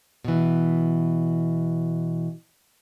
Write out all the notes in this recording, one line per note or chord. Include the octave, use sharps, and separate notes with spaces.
B2 E3